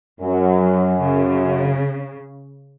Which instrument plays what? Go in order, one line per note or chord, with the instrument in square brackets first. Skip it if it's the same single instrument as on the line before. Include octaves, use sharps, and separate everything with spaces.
[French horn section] F#2 [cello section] F#3
[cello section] C#3